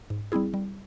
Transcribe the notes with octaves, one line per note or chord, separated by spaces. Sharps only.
G#2
G3 C4 E4 G#4
G3